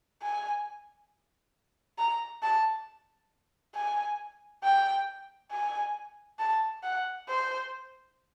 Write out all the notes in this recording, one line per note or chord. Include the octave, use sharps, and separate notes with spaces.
G#5
A#5
A5
G#5
G5
G#5
A5
F#5
C5